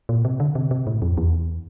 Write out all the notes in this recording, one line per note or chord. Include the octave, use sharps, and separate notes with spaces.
A#2
C3
D3
C3
C3
A2
F2
E2